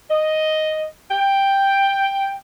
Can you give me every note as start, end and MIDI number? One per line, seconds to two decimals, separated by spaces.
0.10 0.86 75
1.11 2.35 79